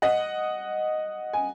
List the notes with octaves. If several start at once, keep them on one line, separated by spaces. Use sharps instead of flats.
D#5 F#5
G#5